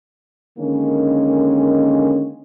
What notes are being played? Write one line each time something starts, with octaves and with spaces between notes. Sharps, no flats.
D3 D#3 G#3 A#3 C#4